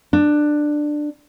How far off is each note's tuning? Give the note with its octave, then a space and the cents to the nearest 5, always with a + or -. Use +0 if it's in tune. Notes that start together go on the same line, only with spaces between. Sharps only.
D4 +15